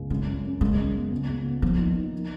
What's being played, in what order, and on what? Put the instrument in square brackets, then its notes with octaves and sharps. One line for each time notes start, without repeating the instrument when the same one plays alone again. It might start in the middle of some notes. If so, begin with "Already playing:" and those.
Already playing: [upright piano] C#2
[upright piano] F#2 [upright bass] G#3
[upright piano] F#2
F#2
[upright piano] C#3 [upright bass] G#3
[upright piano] C#3
B3
C#2
C#2
B3
[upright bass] F3 [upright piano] A#3
[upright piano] D#4
D#4
F3